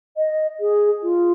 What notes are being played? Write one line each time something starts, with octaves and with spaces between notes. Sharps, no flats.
D#5
G#4
F4